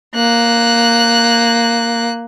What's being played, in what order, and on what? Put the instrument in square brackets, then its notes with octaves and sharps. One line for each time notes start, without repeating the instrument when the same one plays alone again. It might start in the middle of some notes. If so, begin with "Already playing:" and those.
[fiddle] A#3 F#6